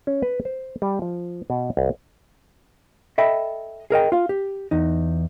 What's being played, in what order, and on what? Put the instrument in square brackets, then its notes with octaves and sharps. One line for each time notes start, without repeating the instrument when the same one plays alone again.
[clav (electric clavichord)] C#4
B4
C5
G3
F3
B2
C2
[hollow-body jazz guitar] A4 D#5 E5 G5 B5
G#4 A#4 D#5 G5
F4 F5
G4
E2 D#4